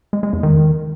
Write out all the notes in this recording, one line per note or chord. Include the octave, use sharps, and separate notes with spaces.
G#3
G#3
E2
D#3